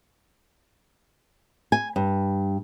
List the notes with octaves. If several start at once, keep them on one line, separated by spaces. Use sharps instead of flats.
G#5
G2